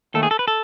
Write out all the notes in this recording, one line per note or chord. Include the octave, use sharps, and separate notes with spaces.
D#2 D#3 A3 A4
G#4
A4
B4
A4